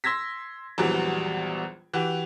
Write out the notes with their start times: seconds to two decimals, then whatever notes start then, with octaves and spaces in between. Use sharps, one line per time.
0.04 C6 E6 G#6 A#6 B6
0.78 A#1 E2 E3 F#3 G3
1.93 E3 F#4 G4